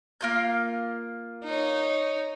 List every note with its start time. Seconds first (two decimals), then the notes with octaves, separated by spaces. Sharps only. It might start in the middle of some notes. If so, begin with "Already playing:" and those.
0.21 A#3 F4 G6
1.44 D#4 C#5